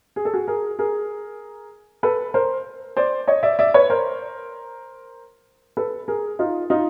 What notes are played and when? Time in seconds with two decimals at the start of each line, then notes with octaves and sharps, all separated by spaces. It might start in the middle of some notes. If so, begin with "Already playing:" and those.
0.16 G#4
0.25 A4
0.34 F#4 G#4
0.47 G#4 A#4
0.79 G#4 A#4
2.03 A4 B4
2.34 A#4 C5
2.97 C5 D5
3.27 C#5 D#5
3.43 D5 E5
3.59 D5 E5
3.74 B4 C#5
3.90 A#4 C5
5.77 A4 B4
6.08 G#4 A#4
6.39 D#4 F4
6.70 D#4 F4